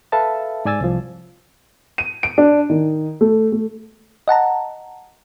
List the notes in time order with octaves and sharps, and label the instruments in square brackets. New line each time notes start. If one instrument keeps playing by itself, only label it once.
[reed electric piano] A4 B4 E5 F5 A5
G#2 D5 G#5 E6 A6
C2 F3
[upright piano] D#7
D7
D4
D#3
A3
A3
[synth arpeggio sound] D#5 F#5 A5 A#5